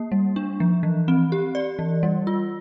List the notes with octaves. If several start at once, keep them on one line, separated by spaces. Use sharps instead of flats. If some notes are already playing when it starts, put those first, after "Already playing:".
Already playing: A#3
G3
D4
F3
E3
C4
G4
D5
E3
G3
F4